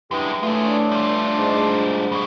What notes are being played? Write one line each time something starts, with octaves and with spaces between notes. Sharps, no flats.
F#2 E3 G#3 D4 G4
A2 E3 A3 F4 G#4
D4
G3 F4
G#2
G2 B2